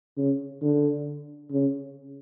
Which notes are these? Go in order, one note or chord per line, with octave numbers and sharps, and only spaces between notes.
C#3
D3
C#3